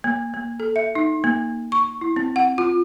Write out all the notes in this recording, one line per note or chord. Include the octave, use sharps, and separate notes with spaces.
A#3
A#3
A4
E5
D#4
A#3
C#6
E4
C4
F#5
F4